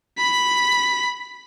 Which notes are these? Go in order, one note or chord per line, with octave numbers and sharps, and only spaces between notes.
B5 B6